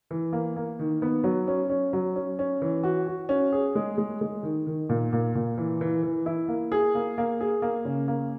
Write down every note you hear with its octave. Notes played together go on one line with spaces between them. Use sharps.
E3
A#3
A#3
D#3
B3
F#3
C#4
C#4
F#3
C#4
C#4
E3
F#4
F#4
C#4
G#4
G#3
G#3
G#3
D#3
D#3
A#2
A#2
A#2
E3
E3
E3
E4
A#3
G#4
A#3
A#3
G#4
A#3
C#3
A#3